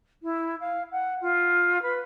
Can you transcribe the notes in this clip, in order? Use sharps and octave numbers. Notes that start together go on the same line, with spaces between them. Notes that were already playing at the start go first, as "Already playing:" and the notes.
E4
F5
F#5
F4
B4